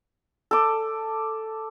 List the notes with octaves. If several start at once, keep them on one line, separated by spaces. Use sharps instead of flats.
A4 D6